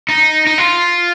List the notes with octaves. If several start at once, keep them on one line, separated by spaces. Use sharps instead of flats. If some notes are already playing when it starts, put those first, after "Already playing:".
D#4
D#4
F4